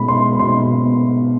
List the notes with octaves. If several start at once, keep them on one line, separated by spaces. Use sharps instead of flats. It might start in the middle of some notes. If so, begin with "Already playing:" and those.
Already playing: B2 G#3 B5
C6
B2 C6
B3